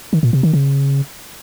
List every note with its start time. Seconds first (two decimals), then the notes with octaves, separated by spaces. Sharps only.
0.13 D#3
0.23 A#2
0.33 C3
0.43 D#3
0.53 C#3